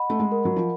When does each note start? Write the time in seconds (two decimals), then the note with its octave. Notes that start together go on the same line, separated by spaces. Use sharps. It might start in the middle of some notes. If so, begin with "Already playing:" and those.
Already playing: D#5 F#5 B5
0.10 A3
0.20 G#3
0.32 A#4
0.45 F#3
0.56 F3